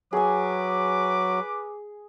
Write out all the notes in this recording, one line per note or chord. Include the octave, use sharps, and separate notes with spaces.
F#3 G#4 B4 G#5 D6